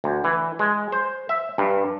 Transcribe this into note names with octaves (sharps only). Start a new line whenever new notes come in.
D2
E3
G#3
C5
E5
G2